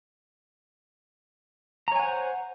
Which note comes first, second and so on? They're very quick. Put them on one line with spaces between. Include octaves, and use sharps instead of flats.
A#5 C#5 G#5 F#5 C5